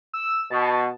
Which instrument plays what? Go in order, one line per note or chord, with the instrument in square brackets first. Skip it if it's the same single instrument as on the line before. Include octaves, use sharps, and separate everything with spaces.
[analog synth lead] E6
[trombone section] B2 [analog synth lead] A5